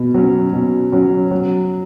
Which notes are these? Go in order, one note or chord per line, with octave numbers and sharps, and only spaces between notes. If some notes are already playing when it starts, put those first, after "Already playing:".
Already playing: B2
F#3 C#4
B2
F#3 C#4
F#3